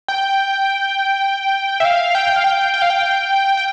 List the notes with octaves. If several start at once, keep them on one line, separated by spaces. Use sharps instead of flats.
G5
E5
F5
G5
F5
G5
G5
F5
G5
G5